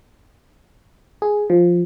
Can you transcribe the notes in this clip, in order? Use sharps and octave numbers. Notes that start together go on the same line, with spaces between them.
G#4
F3